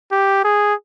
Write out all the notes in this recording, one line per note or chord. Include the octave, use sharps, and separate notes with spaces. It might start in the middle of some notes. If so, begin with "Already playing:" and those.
G4
G#4